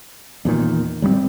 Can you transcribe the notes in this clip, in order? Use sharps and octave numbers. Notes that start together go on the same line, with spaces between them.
E2 A#2 D#3
D1 G3 G#3 C4